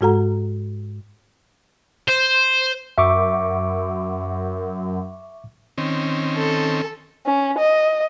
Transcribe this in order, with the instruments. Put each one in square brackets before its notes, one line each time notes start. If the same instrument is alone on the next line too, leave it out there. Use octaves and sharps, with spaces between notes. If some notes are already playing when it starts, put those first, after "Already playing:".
[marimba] G#2 G#3 F#4 A4 F#5 A#5
[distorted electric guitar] C5
[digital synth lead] F#2 [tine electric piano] E5 C#6 D6
[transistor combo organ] D#3 C4 C#4
[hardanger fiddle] A4
[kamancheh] C#4
D#5